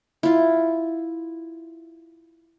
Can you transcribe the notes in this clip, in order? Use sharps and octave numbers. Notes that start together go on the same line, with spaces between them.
E4 F4